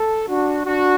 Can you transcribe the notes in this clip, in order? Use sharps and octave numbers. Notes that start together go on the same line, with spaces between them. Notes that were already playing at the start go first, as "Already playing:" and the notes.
Already playing: A4
D4 F#4
D4 F#4